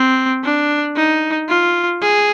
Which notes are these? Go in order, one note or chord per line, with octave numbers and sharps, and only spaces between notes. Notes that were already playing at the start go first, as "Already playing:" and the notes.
Already playing: C4
D4
D#4
F4
G#4